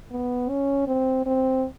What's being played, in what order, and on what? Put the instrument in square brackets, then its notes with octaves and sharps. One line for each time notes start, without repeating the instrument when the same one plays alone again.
[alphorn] B3
C#4
C4
C4